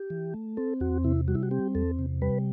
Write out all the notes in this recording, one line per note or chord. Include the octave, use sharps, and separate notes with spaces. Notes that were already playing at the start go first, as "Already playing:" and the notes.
Already playing: G4
E3
A3
C4 A4
E2 F#4
C3 E4
G3 F#4
E4
F#4
C4 G4
E2 A4
C3
G3 B4